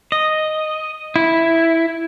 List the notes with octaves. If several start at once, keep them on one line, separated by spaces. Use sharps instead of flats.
D#5
E4